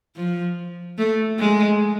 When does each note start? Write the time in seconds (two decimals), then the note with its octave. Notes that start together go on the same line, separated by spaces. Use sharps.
0.16 F3
0.98 A3
1.39 G#3